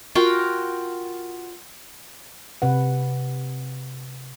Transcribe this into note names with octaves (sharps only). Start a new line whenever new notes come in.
F4 F#4 A#4 G5
C3 B4 F#5